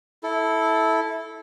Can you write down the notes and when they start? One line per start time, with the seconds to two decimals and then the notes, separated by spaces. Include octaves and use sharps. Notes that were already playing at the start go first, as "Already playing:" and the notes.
0.23 E4 A4